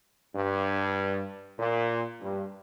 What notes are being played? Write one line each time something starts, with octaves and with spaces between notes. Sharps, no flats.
G2
A#2
G2